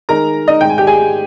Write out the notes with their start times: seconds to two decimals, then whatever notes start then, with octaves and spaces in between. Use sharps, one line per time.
0.09 D#3 G#3 D#4 A#4 A#5
0.48 D#4 D#5
0.61 G#2 D#3 G#3 G5
0.70 G#5
0.78 G4 G5
0.87 G#4 G#5